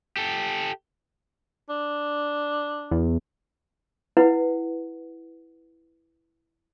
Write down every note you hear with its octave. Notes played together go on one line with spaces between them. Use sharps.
G4 A4
D4
E2
E4 B4 F#5